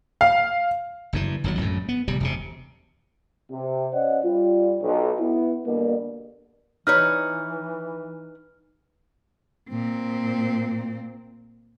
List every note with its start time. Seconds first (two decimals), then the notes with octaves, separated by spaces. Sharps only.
0.21 F5
1.13 F#1 G2 E3
1.44 G1 D#2 D3 F#3
1.57 G#1 F#2 A2
1.89 B3
2.08 D1 C3 G3
2.20 E1 C3
3.51 C3
3.94 C#4 C5 D5 D#5 F#5
4.24 G3 F4
4.82 B1
5.20 B3 E4
5.66 B2 D3 G3 A#3
6.87 E3 D#4 B4 C#5 F6
9.70 A#2 C4